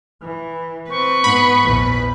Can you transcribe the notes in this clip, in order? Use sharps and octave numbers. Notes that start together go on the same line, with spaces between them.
E3
C4 B4 C#6
G#2 B3 B5
A#1 E2